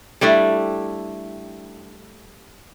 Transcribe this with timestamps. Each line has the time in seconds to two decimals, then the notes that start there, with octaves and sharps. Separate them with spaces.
0.21 G3 A3 D4 E4